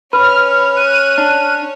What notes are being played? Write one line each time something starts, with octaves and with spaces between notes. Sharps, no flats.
C#4 B4 C#5 F6
F6 F#6 D#7
D4